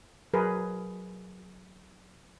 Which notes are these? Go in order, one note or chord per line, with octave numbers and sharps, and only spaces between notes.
F#3 G#4 A#4 B4